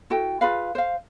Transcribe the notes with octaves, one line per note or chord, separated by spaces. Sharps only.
E4 F#4 A4 G5
F4 G#4 B4 F5
C5 F5